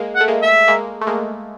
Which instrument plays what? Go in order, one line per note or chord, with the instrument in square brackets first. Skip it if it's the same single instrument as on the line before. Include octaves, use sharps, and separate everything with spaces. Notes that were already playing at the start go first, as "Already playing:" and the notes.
Already playing: [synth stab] G#3 A#3
[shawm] F#5
[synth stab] A3
G#3 A#3
[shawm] E5
[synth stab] G#3 A#3
A3
G#3 A#3